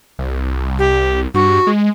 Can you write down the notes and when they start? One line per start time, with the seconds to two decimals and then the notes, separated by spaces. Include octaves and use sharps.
0.19 C2
0.79 G4
1.34 G2 F#4
1.67 G#3